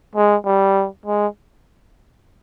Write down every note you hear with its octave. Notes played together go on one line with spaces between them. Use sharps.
G#3
G3
G#3